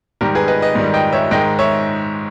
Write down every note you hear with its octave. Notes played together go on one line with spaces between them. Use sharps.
G#2 D#3 G3 G4 A#4
G#4 B4
B4 D#5
B4 D#5
G#2 D#3 G3
D#5 G5
C#5 E5
G#2 D#3 G#3 D#5 G5
C#5 E5